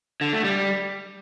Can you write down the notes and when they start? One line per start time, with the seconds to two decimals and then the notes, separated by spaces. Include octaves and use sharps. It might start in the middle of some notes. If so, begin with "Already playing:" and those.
0.21 D3
0.33 A3
0.44 G3